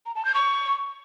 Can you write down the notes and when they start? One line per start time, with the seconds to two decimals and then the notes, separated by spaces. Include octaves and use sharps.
0.06 A#5
0.15 A5
0.25 G6
0.34 C#6